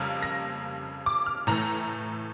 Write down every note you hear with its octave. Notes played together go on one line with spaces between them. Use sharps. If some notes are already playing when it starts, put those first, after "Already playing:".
Already playing: F2 C#3 G3 A#3 F6
A#6
D6
F6
A2 E3 A3 A#5